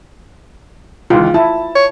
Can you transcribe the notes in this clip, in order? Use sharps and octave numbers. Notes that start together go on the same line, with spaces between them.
C#2 D#3 E3 F4
E4 A5
C#5